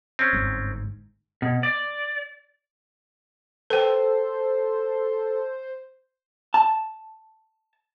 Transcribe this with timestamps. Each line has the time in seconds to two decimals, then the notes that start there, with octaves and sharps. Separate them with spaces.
0.19 C4 C#4
0.33 G1 G#2
1.42 B2
1.63 D5
3.70 A4 B4 C5 G5
6.54 A5